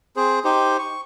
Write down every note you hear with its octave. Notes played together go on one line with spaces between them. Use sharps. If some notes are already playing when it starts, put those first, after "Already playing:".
C4 G#4 C5
D#4 G4 C5
C#6